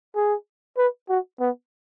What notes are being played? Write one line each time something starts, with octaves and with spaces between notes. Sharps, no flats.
G#4
B4
F#4
B3